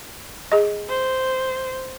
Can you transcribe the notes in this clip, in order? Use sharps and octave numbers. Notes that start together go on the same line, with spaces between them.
G#4 D#5
C5